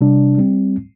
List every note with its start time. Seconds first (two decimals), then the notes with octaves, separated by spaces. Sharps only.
0.01 C3 G3 D4
0.38 G3 C4